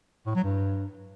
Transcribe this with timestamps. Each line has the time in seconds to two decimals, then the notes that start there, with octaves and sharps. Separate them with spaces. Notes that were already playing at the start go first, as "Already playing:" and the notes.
0.26 A2
0.35 F#3
0.44 G2